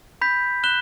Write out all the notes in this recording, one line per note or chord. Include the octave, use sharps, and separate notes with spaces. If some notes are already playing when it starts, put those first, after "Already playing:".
B5 G6 B6
F#6 E7 G7